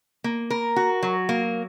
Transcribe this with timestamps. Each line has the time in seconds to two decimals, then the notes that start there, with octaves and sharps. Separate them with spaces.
0.24 A#3
0.50 A#4
0.76 F#4
1.03 F#3
1.29 A#3